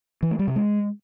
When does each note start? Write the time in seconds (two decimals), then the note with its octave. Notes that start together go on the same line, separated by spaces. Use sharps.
0.23 E3
0.31 A3
0.39 G3
0.48 C3
0.56 G#3